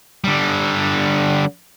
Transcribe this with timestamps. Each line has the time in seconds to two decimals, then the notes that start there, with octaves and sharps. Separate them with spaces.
0.24 D3 G3